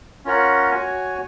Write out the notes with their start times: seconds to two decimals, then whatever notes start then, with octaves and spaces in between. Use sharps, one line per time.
0.25 C#4 F4 A#4 C#5 F#5
0.71 F#4 C#5 G#5